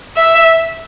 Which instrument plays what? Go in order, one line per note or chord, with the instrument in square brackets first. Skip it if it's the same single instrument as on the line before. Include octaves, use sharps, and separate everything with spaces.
[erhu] E5